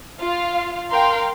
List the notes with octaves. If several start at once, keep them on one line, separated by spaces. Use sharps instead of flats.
F4 F5
A#4 F5 G5 C6